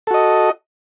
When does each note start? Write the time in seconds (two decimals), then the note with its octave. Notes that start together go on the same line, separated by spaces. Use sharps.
0.07 A4
0.11 F#4
0.14 D#5